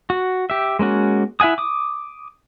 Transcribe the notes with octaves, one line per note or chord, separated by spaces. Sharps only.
F#4
G4 E5
G#3 A#3 C#4 F#4
E4 E5 F#5 G#5 D#6
D6 D#6